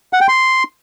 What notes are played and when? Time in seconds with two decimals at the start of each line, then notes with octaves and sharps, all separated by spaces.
0.13 F#5
0.21 G5
0.28 C6